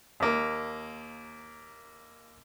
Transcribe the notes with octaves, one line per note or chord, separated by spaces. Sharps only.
D#2 A#3